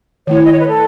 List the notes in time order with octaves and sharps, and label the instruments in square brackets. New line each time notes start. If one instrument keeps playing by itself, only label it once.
[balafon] D#3 A3 E4 [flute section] C#5
[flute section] D#5
C#5
B4
A4